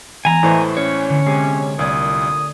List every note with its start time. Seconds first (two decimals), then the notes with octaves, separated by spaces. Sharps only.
0.25 E3 G#3 B3 G#5 A#5
0.43 A2 E3 A3 C5 D5 D#5
0.77 C#4 C#5
1.10 D3 F#3
1.26 C3 G#3 G#5 D6 C7
1.79 C2 A#2 A3 D5 D#6 G#6